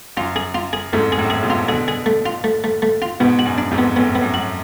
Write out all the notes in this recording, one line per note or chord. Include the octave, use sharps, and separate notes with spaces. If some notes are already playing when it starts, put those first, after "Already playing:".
F#2 F4
G#4
F4
G#4
F2 G#2 A3
G#4
F#2 A2
G#4
G#2 B2
F4
B2 D3 G#4
G#4
A3
F4
A3
A3
A3
F4
G#2 B2 B3
F#4
F#2
D4
F2 G#2
B3
F#2 A2 B3
B3
F#2
F#4